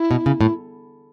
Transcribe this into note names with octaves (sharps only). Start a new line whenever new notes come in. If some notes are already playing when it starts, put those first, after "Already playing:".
Already playing: E4
B2
C#3
A2